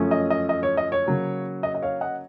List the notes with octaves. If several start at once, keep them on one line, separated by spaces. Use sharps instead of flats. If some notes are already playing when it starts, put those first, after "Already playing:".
Already playing: F#2 F3 A3 C#4
D#5
D#5
D#5
C#5
D#5
C#5
C#3 F#3 A#3
D#5
D#5
C#5 F5
D#5 F#5